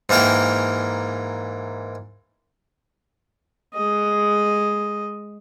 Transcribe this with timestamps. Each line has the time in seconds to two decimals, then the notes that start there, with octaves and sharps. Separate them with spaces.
0.09 G#2 E3 A#3 A#4 G5
3.74 G#3 D#5